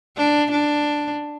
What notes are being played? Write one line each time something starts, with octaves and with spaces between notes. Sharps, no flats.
D4
D4